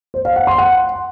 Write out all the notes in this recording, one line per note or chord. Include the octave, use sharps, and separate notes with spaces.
C5
F5
F#5
C6
F#5